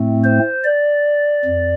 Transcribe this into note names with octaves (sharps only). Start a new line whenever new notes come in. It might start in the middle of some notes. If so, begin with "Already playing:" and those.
Already playing: A2 A3 C4
C5
D5
F2